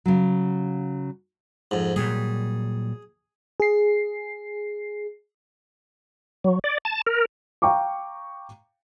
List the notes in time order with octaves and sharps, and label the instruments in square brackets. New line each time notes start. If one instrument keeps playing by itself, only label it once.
[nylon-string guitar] C#3 F#3
[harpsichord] F2 G#2
[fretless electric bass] A#2 F#3 G3 [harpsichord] G#4
[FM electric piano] G#4 C7
[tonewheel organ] F#3
D5
A5
A#4
[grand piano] F5 G5 A#5 C#6 D6